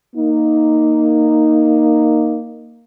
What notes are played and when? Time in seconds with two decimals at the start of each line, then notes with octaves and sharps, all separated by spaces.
0.16 A#3 D#4